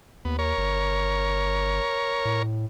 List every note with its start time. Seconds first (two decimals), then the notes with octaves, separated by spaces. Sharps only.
0.25 D#2 B3
0.39 A#4 C#5
0.58 G1
2.25 A2